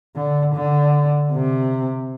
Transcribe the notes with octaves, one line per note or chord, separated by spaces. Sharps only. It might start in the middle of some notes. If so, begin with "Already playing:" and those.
D3
D3
C3